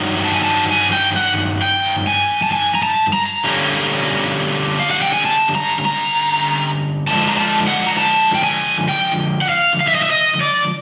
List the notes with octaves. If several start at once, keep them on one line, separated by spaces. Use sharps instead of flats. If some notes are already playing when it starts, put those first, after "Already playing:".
Already playing: G2 D#3 F#3
A5
G#5
A5
G#5
G5
F#5
G5
G#5
A5
G#5
A#5
A5
A#5
D3 G3 A#3 C#4
F5
F#5
G5
G#5
A5
A#5
A#5
D3 F3 G#3 A5
A#5
A5
F#5
A#5
A5
G5
G#5
G5
F#5
F5
F5
E5
D#5
E5
D#5
D5